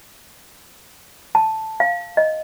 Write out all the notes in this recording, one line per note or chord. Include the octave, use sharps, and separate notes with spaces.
A5
F5
D#5